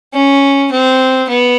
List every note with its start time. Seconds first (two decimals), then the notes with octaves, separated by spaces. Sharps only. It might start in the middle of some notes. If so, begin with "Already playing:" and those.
0.13 C#4
0.71 C4
1.29 B3